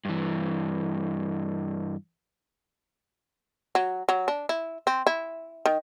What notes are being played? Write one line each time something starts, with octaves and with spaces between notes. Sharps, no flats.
G2 E3
F#3
F#3
D4
E4
C4
E4
D#3